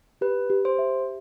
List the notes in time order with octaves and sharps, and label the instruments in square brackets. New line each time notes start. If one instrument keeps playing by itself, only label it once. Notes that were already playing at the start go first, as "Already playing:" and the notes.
[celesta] G4 [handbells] B4
[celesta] G4
[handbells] C5
[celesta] E5